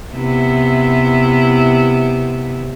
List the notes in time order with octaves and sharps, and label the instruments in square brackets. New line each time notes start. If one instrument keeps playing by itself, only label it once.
[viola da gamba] C3 B3 E4